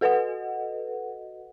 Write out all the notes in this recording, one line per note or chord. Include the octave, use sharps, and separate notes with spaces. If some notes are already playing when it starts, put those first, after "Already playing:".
F#4 A4 B4 D#5 F#5